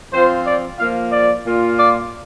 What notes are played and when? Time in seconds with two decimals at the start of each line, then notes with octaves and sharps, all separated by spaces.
0.13 F3 C4 F4 C5
0.47 D5
0.79 F3 A#3 F4 F5
1.13 D5
1.46 A#2 A#3 F4
1.79 D5